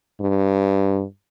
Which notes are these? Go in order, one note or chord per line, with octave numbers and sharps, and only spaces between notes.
G2